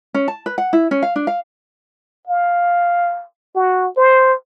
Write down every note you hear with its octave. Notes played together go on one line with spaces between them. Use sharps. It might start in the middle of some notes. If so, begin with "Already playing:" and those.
C#4
A5
B4
F#5
E4
C#4
F5
D4
F5
F5
F#4
C5